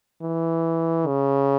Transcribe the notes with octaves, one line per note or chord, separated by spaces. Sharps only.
E3
C#3